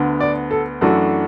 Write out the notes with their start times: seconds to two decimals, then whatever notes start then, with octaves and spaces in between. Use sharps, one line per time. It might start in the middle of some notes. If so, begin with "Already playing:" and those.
Already playing: D2 D3 B3
0.20 D5
0.51 A4
0.81 F#2 E3 A3 D4 F#4